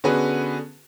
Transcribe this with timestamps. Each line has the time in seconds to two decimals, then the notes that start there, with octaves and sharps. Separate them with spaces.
0.04 D3 B3 C#4 F#4 G#4 B4